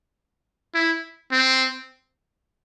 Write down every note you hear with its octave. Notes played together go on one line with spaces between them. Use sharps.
E4
C4